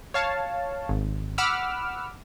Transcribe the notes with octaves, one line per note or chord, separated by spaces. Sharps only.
C#5 F5 A5
G#1
F#5 B5 D6 E6 F6